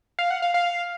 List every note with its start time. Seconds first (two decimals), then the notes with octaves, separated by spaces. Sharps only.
0.19 F5
0.30 F#5
0.42 F5
0.54 F5